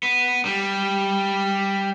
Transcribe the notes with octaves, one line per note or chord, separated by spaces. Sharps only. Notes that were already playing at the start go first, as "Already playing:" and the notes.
B3
G3